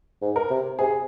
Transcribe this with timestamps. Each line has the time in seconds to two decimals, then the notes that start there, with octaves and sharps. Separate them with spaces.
0.22 G#2
0.36 A#4
0.50 C3
0.79 C3 G#4